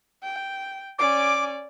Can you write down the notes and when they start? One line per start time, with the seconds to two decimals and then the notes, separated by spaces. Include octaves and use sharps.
0.23 G5
0.99 C#4 D5 D6